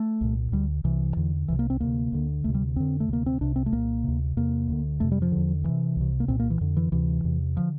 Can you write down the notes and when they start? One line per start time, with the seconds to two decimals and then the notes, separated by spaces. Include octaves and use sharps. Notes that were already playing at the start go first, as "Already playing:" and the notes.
Already playing: A3
0.21 C2 A#2
0.52 D2 D3 G3
0.84 C2 C3 E3
1.16 E2 D3
1.48 C2 C3 E3
1.59 A#3
1.70 C4
1.80 D2 C3 A#3
2.12 D2 D3
2.44 D2 C3 A3
2.54 G3
2.76 F2 D3 C4
3.00 A3
3.08 D2 C3 A#3
3.26 C4
3.41 C2 C3 D4
3.56 C4
3.66 A3
3.72 C2 A#2 A#3
4.04 D2 C3
4.36 E2 C3 A#3
4.68 D2 D3
5.00 F2 C3 A3
5.12 G3
5.22 F3
5.32 E2 D3
5.64 D2 C3 E3
5.96 C2 C3
6.20 A#3
6.28 C2 A#2 C4
6.39 A#3
6.50 E3
6.61 F2 D3
6.76 E3
6.92 D2 C3 E3
7.24 E2 C3
7.57 D3 F3